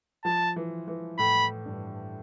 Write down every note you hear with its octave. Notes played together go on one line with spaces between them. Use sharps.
F3 A5
E3
E3
A2 B5
G2